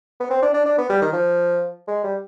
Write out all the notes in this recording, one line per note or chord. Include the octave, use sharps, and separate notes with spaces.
B3
C4
D4
D4
D4
B3
G3
D#3
F3
G#3
G3